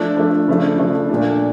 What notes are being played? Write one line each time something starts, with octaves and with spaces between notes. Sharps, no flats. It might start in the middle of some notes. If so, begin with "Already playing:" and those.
Already playing: F3 A3 D4
F3 A3 D4
C#3 F3 A3 D4
C#3 F3 A3 D4
A#2 A3 D4